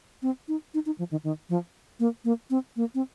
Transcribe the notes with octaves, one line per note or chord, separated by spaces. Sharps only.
C4
D#4
D#4
D#4
F3
D#3
D#3
F3
A#3
A#3
C4
A#3
C4